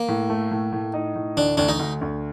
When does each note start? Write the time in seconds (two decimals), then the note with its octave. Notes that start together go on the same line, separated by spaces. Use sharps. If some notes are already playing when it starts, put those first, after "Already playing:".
Already playing: A#3
0.08 A2
0.30 A3
0.51 A2
0.72 A2
0.94 D#4
1.15 A2
1.37 D2 D4
1.57 D2 D4
1.69 D#4
1.79 D2
2.01 D2